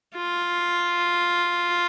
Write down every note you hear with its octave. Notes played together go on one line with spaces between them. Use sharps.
F4